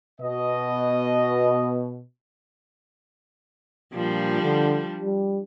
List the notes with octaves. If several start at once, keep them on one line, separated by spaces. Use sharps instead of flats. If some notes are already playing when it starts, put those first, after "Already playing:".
B2 D#5
A#2 F3 G3 D4
D3
G3